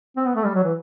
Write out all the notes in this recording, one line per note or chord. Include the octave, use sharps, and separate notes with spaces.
C4
B3
A3
G3
F#3
E3